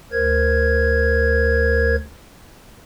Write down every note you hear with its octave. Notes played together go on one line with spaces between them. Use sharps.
D2 A#4 C5 G#6